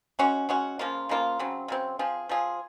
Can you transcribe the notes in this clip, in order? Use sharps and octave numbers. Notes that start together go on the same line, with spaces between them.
G#3 C#4 F#4
G#3 C#4 F#4
C#3 F3 A#3 F4
C#3 F3 A#3 F4
C#3 F#3 C4
C#3 F#3 C4
F3 C4 F4 G#4
F3 C4 F4 G#4